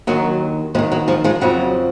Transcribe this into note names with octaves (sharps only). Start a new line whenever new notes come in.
D#2 D#3 F#3
D#2 D#3 F3 G#3
F#3
F3 G#3
F3 G#3
F2 C#3 F3 F#3